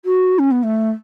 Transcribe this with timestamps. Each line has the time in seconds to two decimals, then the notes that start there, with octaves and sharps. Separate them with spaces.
0.05 F#4
0.39 C#4
0.51 B3
0.63 A3